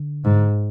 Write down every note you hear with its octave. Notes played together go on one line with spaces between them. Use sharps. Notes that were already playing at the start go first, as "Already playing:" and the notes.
Already playing: D3
G#2